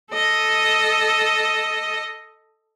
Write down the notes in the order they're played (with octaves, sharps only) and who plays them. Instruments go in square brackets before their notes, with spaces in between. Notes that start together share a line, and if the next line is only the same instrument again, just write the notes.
[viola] A4 D#5